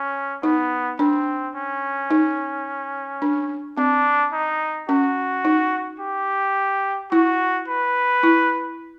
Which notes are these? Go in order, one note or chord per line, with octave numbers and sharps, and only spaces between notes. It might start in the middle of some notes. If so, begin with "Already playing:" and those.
Already playing: C#4
B3 D#4
C4 D4
C#4
D#4
D4
C4 D4
D#4
C#4 F#4
D#4
G4
E4 F#4
B4
E4